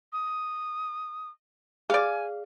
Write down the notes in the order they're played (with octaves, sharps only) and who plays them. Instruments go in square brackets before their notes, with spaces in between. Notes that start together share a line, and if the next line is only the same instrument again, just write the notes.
[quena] D#6
[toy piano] G#4 [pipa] D5 F5 [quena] G#5